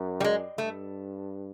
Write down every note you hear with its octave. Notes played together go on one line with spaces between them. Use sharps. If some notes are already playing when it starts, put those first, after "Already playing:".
Already playing: F#2
G3
G#3
G2 A3